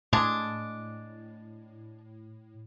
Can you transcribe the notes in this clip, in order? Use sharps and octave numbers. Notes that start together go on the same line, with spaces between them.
A2 G#3 D4